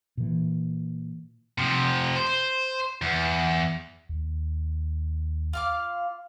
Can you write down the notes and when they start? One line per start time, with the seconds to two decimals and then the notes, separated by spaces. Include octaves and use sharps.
0.17 A#2 E3
1.58 C3 F3
2.16 C5
3.02 E2
4.09 D#2
5.53 F4 F5 D6